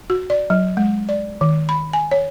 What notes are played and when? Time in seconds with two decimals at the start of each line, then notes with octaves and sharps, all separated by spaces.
0.10 F#4
0.30 D5
0.50 F#3
0.77 G#3
1.09 D5
1.41 D#3
1.69 B5
1.93 G#5
2.11 C#5